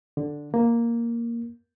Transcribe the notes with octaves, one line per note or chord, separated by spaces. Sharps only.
D3
A#3